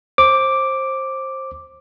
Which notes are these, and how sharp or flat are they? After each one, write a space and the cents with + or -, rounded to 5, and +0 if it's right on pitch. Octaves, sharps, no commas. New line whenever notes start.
C5 +20 D6 +0